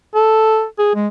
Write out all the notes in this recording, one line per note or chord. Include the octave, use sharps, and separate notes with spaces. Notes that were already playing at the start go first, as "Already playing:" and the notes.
A4
G#4
G#3